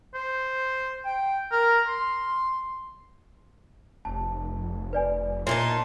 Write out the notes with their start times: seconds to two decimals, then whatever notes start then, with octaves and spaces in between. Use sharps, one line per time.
0.14 C5
1.05 G5
1.52 A#4
1.88 C6
4.05 F1 A5
4.93 B4 D5 G#5
5.47 A#2 D#4 C#5 E5 A5 C6